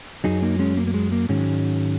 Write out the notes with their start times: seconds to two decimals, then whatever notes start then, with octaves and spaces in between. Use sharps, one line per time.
0.24 F#2 F#3 D#4 G#4
0.42 A#3 D#4
0.59 G#3 C#4
0.77 A#3
0.87 A#3
0.94 G#3
1.12 A#3
1.29 G#2 D#3 F#3 G#3 C#4